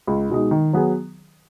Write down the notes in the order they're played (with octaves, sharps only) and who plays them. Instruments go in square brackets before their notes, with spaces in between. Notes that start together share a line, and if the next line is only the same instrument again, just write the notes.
[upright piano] C#2
B2 G#3 D#4
D#3
F#3 B3 G#4